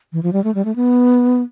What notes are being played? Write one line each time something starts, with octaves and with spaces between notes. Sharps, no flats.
E3
F3
G3
A3
G3
A3
B3